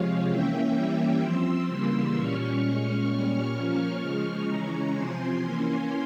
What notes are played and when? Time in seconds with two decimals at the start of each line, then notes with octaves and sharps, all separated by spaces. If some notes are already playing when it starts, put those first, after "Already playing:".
Already playing: C3 F3 G#3 C#5 F5
0.27 E3 A#3 C#4 E5 G5
0.74 E3 G3 A#3 C#4
1.21 F3 C4 C6 E6
1.68 C#3 E3 G3 A#3
2.14 A#2 G3 C#4 C#6 F6
2.61 A#2 G#3 C#4
3.08 A#2 G3 C#4
3.54 F3 A#3 C#4 C#6 F6
4.01 C#3 F3 G#3
4.47 C#3 E3 G#3 C#4 A#5 C#6
4.94 C3 F3 C4 G#5 C6
5.40 E3 A#3 C#4